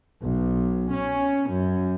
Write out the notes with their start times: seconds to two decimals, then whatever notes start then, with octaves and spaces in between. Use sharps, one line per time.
0.22 B1
0.92 C#4
1.50 F#2